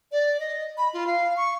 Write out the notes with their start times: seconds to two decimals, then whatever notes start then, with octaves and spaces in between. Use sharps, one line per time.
0.12 D5
0.40 D#5
0.78 B5
0.94 F4
1.07 F5
1.37 C#6